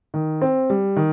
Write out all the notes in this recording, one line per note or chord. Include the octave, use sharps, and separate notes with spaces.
D#3
C4
G3
D#3